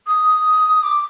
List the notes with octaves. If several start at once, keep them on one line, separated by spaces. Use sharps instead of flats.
D#6
D6